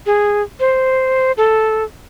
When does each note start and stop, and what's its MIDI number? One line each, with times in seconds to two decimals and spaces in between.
0.06 0.42 68
0.60 1.32 72
1.37 1.84 69